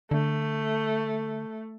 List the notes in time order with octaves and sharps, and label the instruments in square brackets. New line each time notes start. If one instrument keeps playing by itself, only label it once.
[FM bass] D3 [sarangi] A3